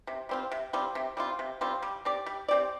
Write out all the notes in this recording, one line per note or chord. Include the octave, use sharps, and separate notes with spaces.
C3
G3 C4 F4
C3
G3 C4 F4
C3
G3 C4 F4
C3
G3 C4 F4
G3
C4 G4 D5
G3
C4 G4 D5